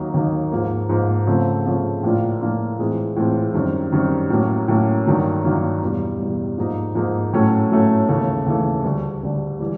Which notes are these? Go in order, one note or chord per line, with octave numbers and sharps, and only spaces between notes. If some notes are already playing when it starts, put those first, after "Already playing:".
Already playing: D#2 D#3 F#3 A#3 D#4
D#2 D#3 F#3 A#3 D#4
G#2 F3 A#3
G#2 F3 A#3
C#3 F3 A3 C4
C#3 F3 A3 C4
A2 F3 A#3 D4 F4
A2 F3 A#3 D4 F4
A2 E3 G#3 C4 F4
A2 E3 G#3 C4 F4
F#2 D#3 G3 C4
F#2 D#3 G3 C4
A2 F#3 A#3 C#4
A2 F#3 A#3 C#4
G2 D#3 F#3 A#3
G2 D#3 F#3 A#3
E2 B2 G3
E2 B2 G3
G#2 F3 A#3 D#4
G#2 F3 A#3 D#4
A2 F#3 A3 C#4
A2 F#3 A3 C#4
D#2 C#3 E3 A3
D#2 C#3 E3 A3
D2 D3 G3
D2 D3 G3
E3 G3